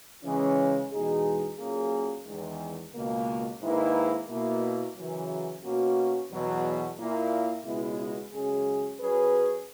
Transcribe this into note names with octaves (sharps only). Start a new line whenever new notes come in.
C#3 E3 G#3 C#4
E2 B2 G#3 D#4 G#4
A#2 F#3 A#3 C#4 G#4
E2 D#3 G#3
C#2 B2 A#3
G#2 D#3 A#3 E4 B4
B2 A#3 E4
F#2 C#3 E3
B2 A#3 C#4 F#4
E2 B2 F#3
A#2 A#3 E4
C#2 B2 G#3 B3 E4
F#2 C#3 G#3 C#4 G#4
F#3 C#4 G#4 B4